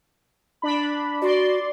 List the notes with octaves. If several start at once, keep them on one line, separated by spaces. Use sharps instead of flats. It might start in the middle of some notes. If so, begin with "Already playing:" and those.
D4 B5
F#4 D5 C6